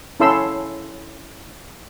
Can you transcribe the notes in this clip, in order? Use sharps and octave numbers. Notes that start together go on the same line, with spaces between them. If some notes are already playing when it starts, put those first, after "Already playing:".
C#4 E4 A4 E5 C6 E6